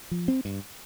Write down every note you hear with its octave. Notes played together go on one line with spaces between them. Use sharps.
F3
C4
G2